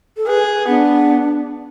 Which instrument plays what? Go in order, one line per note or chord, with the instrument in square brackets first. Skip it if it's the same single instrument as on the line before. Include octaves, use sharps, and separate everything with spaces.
[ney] A4
[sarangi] G#4 [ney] B4
[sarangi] B3 [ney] D4